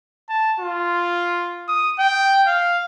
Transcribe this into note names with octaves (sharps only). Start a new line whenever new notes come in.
A5
F4
D#6
G5
F5